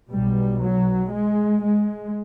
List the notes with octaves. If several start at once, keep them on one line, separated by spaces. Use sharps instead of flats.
B1 B2 G3
F#3
G#3
G#3